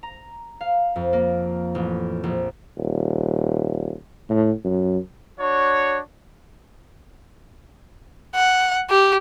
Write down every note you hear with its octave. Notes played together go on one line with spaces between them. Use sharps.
A#5
F5
F2
A#3
A1
A#1
D#1
A2
F#2
D4 F#4 C#5
F#5
G4